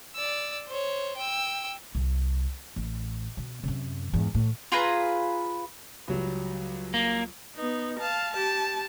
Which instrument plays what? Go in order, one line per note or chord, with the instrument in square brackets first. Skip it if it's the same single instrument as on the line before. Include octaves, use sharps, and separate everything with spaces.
[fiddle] D5 E6
C5 C#5
G5 E6
[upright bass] C2
A1
B2
F#2 C3
E2 G#2
A2
[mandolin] F4 G#4 B4 A#5
[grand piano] C#2 F#3 G3
[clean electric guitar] A#3
[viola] B3 D#4
F5 A5
G4 A5